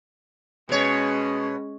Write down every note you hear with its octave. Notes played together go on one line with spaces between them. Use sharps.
B2 G#3 C#4 C#5